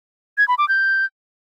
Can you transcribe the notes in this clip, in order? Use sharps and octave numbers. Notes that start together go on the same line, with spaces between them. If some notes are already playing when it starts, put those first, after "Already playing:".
G#6
B5
D6
G6